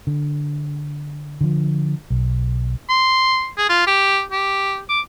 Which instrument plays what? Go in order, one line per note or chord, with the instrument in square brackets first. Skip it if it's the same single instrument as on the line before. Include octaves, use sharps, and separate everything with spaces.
[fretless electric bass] D3
D3 F3
B1
[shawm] C6
G#4
F4
G4
G4
D6